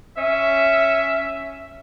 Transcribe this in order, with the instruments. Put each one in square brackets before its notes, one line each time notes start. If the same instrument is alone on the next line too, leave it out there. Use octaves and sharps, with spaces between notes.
[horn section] C#4 E5